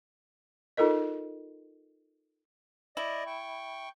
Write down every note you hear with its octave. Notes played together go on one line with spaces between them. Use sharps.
D#4 F4 A4 A#4 D#5
E4 D5 D#5
G5 C#6